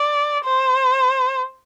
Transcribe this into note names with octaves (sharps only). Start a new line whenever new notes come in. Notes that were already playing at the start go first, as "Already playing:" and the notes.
Already playing: D5
C5